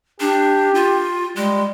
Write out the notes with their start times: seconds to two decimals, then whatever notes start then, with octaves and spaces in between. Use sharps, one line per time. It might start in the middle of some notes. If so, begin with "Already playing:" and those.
0.21 D4 G4
0.75 F4
1.37 G3 G#3